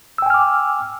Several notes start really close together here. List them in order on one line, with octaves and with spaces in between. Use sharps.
E6 G5 G#5 F6 D6